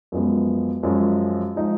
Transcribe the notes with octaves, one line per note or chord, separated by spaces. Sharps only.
F#2 F3 G#3 B3
F#2 F3 G#3 C#4
F3 G#3 D#4